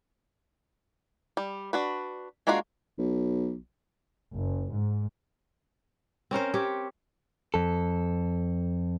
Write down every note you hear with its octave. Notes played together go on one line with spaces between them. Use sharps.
G3
D4 F#4 B4
G#3 A#3 D4 F4 F#4
B1
F#1
G#2
C4 C#4 A#4 C5
C4 G4 C#5
F2 A4